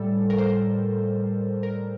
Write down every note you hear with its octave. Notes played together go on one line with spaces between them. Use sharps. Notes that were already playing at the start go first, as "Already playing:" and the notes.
Already playing: A2 G3 A4
A#4
C5
A#4
A#4